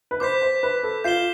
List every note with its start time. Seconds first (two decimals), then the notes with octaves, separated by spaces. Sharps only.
0.11 B4
0.20 C5 D6 G6 B6
0.42 C5
0.63 B4
0.83 A4
1.04 F4 G6 C7 E7 G7